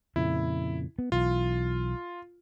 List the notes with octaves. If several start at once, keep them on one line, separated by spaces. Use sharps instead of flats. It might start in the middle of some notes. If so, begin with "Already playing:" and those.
F2 A#2 C#3 E4
B3
B1 E3 F4